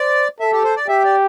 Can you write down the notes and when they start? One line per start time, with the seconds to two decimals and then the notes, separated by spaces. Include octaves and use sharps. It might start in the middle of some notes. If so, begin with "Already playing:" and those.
Already playing: C5 D5
0.40 A4 E5
0.52 G4
0.64 C5
0.76 D5
0.88 G4 E5
1.05 D5